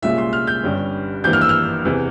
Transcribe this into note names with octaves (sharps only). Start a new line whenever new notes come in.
C2 A#2 G#3 C#4 F4 E5
C6
F6
G6
G1 G2 G3 C#4
G#1 G2 E3 A#3 E4 G6
F6
E6
F6
E2 C3 E3